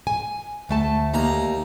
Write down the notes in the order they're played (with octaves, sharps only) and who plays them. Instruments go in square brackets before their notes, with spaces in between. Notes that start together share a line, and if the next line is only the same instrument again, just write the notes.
[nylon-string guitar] G#5
D2 A3 A5
[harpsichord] D#2 A#5